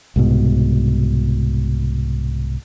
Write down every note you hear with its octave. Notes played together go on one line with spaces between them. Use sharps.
C2 G#2 B2